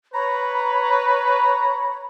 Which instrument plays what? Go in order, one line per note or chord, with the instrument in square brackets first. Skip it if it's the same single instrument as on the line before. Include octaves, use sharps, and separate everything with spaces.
[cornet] B4 [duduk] C#5 [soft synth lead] A#5 [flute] B5